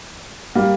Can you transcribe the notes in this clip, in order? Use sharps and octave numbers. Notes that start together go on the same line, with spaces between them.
G3 A#3